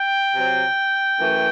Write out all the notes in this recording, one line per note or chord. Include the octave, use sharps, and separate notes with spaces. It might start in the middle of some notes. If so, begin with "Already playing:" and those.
Already playing: G5
C3 F#3 C4
F#2 E3 A3